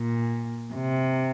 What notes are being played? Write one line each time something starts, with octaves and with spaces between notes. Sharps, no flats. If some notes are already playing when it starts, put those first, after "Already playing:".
Already playing: A#2
C3